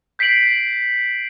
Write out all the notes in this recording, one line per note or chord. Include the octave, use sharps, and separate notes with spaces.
G6 B6 C7 D7 F#7